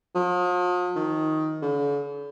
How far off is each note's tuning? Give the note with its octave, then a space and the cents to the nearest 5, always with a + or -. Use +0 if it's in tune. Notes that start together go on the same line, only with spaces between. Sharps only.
F3 +45
D#3 +10
D3 -45